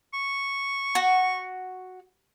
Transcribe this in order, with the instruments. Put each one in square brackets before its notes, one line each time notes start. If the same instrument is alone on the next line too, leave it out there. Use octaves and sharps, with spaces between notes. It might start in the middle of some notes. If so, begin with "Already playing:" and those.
[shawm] C#6
[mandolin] F#4